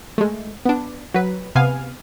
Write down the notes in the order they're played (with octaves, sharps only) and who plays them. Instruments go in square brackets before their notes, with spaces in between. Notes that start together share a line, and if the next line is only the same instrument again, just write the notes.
[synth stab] G#3 A3
B3 D4
F#3 B4
C3 B3 F5 G#5